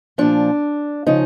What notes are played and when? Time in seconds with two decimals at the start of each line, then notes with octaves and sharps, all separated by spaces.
0.18 A#2 F3 D4
1.07 C#3 F3 D#4